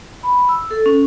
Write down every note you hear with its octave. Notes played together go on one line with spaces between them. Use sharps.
B5
E6
A4
C#4